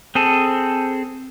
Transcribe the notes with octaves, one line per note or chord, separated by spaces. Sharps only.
C4 G#4 A4